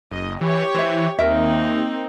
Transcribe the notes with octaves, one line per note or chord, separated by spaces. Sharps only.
F#1 D#5
E3 G4 C#5
E3 C5 E5
D#2 A#3 C4 D#4 A#4 E5